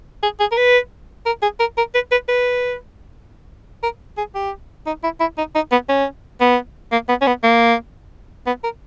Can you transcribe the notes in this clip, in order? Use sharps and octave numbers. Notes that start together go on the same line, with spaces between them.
G#4
G#4
A#4
B4
A#4
G#4
A#4
A#4
B4
B4
B4
A#4
G#4
G4
D#4
E4
E4
D#4
D#4
B3
C#4
B3
A#3
B3
C#4
B3
A#3
B3
A#4